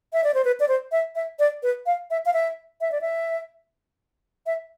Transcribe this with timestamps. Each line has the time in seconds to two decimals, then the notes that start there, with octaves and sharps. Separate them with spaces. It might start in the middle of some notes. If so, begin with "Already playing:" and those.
0.13 E5
0.24 D5
0.34 C5
0.45 B4
0.60 D5
0.68 C5
0.92 E5
1.15 E5
1.39 D5
1.63 B4
1.86 F5
2.11 E5
2.26 F5
2.33 E5
2.81 E5
2.92 D5
3.01 E5
4.46 E5